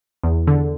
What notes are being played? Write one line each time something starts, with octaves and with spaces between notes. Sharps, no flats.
E2
D3